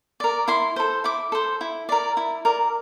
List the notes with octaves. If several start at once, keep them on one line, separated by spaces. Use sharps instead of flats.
A#4 D5
E4 C6
A4 C5
E4 D6
A4 C5
E4
A#4 D5
E4
A#4 D5